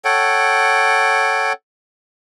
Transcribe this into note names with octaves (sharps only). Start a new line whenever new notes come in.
A4 C#5 F#5 G5